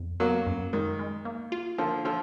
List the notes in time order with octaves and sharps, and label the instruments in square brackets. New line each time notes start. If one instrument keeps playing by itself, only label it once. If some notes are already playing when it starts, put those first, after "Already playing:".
Already playing: [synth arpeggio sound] F2
[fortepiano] F#3 A#3 [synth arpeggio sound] B3
[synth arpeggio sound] F#2
[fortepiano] D#3 [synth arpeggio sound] G#3
[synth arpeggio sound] G#3
A#3
F4
[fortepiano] D3 F3 [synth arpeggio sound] A#3
[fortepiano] D3 F3 [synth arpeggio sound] F4